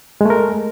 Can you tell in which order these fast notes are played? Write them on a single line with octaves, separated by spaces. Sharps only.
G#3 A3 A#4